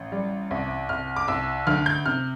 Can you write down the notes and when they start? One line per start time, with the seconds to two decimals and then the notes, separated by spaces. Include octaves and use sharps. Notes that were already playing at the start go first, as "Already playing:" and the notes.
Already playing: A1
0.12 G3
0.51 C2
0.89 C2 F6
1.16 D6
1.28 C2 E6
1.67 D2 F6
1.86 G6
2.06 C3 F6